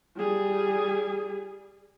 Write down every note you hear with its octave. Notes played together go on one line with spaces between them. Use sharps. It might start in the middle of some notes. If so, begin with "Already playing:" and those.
G3 G#4